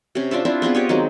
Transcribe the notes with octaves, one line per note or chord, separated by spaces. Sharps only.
C3 C#4
D4 F4 D5 E5
C4 D4 E4 F4
B3 C4 F4 G#4
G4 C#5 D#5
D#3 F#3 G#3 C4